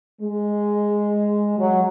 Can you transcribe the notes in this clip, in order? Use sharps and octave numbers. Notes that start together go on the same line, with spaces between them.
G#3
F#3